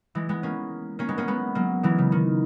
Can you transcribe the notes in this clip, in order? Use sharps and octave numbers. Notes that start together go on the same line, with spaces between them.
E3 G#3
G#3 B3
A#3 C#4
A#3 C#4
G#3 B3
A#3 C#4
G#3 B3
F#3 A#3
E3 G#3
C#3
D#3